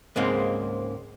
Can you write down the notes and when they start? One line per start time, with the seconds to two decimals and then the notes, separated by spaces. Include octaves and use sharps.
0.16 C#2 G#2 G#3 A#3 C4